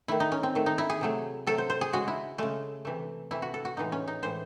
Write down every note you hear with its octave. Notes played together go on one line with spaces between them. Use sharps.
D#3 A3 E4
D#4
C#4
C4
D#3 A3
D#4
E4
G#4
C3 F#3 A3
C3 F#3 A3 A4
C5
C5
G#4
C#3 G#3 F#4
E4
C#3 G#3 A3
C3 E3 A3
C3 E3 A3 E4
F#4
A4
F#4
A2 E3 G#3 D#4
C#4
D#4
A2 E3 G#3 C5